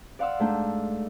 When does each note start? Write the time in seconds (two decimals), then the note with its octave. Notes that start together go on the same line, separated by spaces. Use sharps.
0.19 D5 F5 F#5 C6 D6 E6
0.40 G#2 A3 D4 G6